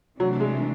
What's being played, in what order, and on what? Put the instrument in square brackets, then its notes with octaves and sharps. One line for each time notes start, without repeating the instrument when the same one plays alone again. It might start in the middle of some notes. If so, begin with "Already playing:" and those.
[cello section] C3 E3 A3 D4 [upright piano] F#3
[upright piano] G#3